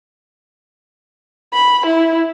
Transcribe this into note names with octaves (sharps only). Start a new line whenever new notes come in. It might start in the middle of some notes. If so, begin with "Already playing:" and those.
B5
E4